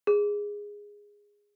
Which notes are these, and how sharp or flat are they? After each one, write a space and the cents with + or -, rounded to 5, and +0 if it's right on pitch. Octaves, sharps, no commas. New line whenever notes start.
G#4 -10